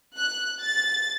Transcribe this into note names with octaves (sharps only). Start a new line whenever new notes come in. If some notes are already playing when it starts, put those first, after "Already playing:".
F#6
A6